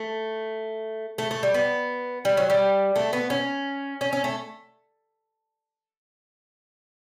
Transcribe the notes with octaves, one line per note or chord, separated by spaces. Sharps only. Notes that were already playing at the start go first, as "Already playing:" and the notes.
Already playing: A3
A3
A3
G3
B3
G3
F#3
G3
A3
B3
C#4
C#4
C#4
A3